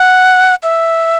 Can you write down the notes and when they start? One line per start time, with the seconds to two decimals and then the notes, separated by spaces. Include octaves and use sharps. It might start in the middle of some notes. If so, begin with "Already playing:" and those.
Already playing: F#5
0.63 E5